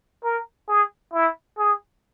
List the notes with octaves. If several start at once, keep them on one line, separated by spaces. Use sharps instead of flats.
A#4
G#4
E4
G#4